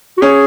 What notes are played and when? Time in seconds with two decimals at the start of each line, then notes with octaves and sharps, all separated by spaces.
0.18 F#4
0.22 C#4 G#4